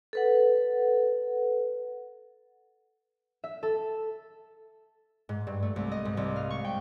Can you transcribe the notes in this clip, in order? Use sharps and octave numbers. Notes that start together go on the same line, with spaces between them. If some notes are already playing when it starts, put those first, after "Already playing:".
A4 B4 F#5
E5
A4
G#2
G2
A3
C2
D#5
G#2
C2
F5
C#6
G5